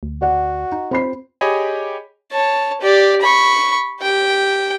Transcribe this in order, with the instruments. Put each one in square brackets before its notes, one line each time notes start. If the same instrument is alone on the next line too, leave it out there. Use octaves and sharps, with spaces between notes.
[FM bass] D2
[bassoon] F#4 [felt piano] D5 F#5
[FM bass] D#4
[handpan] C4 F4 [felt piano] C5 B5 C7
[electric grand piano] G4 G#4 C#5 D#5 G#5 B5
[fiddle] C#5 A5
G4 D5
B5 C#6
G4 G5